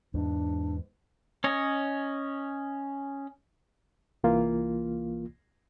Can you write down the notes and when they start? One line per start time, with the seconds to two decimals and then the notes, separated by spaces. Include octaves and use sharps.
0.14 E2 G#2 D4
1.44 C#4 C#5 D#5
4.24 C2 E3 A#3 F4